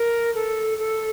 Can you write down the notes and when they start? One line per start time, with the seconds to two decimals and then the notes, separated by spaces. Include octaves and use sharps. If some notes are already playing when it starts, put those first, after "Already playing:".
Already playing: A#4
0.35 A4
0.79 A4